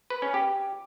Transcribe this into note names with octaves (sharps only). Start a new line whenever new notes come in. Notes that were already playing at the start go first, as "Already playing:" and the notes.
B4
C#4
G4